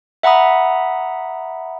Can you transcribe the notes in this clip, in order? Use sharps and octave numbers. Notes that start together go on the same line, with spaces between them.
E5 F#5 A#5 B5 D#6